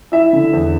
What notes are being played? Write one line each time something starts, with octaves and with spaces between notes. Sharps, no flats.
E4 E5
D3
E2